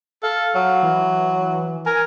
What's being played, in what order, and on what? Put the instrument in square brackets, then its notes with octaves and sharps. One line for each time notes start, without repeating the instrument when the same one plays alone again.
[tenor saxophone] A4 [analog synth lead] F5
[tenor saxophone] F#3
[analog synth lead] E3
[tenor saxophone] A#4 [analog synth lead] G#5